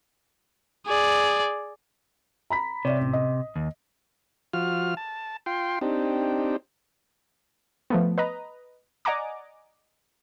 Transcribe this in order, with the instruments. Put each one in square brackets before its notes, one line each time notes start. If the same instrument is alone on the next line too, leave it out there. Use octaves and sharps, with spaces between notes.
[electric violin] G#4 D5
[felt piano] A#5 B5 B6
[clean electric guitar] C3 [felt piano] C#5 D5 E5
[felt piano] A1
D#5
[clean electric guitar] D#2
[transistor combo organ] F3 F4 F#4 F6
A5
F4 G5 C6
C4 D4 D#4 G4
[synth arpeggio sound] F3 A3 B3
B4 D#5 A#5
D5 D#5 F#5 G#5 A#5 D6